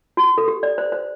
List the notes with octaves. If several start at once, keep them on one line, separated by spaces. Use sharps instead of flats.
F#4
A4
G4
D5
C5
C5